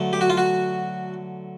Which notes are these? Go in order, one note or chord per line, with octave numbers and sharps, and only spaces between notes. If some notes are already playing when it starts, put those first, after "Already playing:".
Already playing: D3 F#3 A3
G4
F#4
F4
F#4